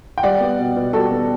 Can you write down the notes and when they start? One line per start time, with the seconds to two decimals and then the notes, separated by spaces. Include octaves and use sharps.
0.18 G5
0.23 G3 D5 F#5
0.40 B3
0.59 B2
0.77 B2
0.93 G3 F#4 A4
1.11 B3